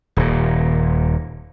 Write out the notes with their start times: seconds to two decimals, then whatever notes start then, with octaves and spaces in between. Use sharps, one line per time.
0.17 D#1 A#2